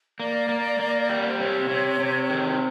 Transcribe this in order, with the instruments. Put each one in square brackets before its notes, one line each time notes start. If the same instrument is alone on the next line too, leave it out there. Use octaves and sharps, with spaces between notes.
[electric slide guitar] A#3 [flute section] D5
[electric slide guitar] A#3
A#3
G3
[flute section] C5
[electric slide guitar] C3 [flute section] C#5
[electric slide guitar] C3
C3
D#3